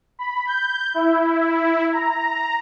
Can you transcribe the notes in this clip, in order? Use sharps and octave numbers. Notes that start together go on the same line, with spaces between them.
B5
G6
E4
A#5